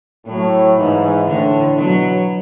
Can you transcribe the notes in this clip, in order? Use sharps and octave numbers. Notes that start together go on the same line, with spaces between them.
A2 F#3
G#2 E3
A2 D3
B2 F#3